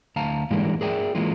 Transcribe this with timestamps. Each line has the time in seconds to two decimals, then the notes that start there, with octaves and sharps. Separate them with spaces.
0.16 D2 F5 A5 A#5
0.50 G#2 E3 G3 G#3 A#3 D4
0.81 G#4 A#4 D5 E5 G5
1.15 E3 G#3 A#3 F4